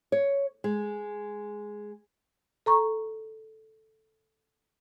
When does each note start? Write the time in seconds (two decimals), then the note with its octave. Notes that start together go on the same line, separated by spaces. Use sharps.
0.12 C#5
0.64 G#3
2.66 A4 A#5 C#6